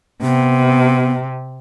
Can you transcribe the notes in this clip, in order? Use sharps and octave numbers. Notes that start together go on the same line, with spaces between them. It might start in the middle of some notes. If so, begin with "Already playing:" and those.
C3 B3